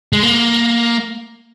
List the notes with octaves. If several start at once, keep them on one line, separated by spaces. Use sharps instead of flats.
G#3
A#3